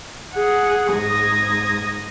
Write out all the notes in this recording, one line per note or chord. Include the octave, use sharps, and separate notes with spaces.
G#4 F#5
G#2 D#6 G#6 A#6